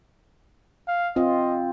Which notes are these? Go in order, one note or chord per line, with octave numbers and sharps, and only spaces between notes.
F5
C4 F4 D#5